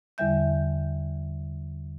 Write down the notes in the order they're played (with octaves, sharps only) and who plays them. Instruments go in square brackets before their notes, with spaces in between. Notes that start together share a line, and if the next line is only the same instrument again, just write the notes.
[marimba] E2 D3 G3 E5 G6